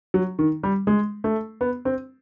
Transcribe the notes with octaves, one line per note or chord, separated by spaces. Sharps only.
F#3
D#3
G3
G#3
A3
B3
C4